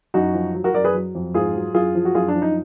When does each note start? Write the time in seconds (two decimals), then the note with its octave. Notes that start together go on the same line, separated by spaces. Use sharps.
0.14 F#2 D#4 F#4
0.34 F3
0.54 F#3
0.64 F#4 A#4
0.74 F#2 A#4 D5
0.84 G#4 B4
0.94 F#3
1.15 F2
1.34 G#2 F4 G#4
1.55 F#3
1.74 F#2 F4 G#4
1.95 F3
2.05 F#4
2.15 F#2 F4 G#4
2.28 D4
2.35 F3
2.42 D#4